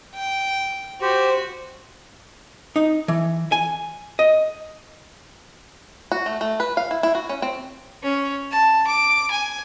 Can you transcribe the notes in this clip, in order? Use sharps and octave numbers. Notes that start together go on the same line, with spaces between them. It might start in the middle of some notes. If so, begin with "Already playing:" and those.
G5
F#4 G4 C5
D#4
E3
G#5
D#5
F#4
A3
A3
B4
F5
E4
E4
F#4
C#4
C4
C#4
A5
D6
G#5